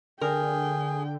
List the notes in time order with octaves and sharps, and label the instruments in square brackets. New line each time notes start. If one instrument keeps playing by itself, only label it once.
[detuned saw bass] D3 [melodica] G#4 [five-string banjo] A#4 [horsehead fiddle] G5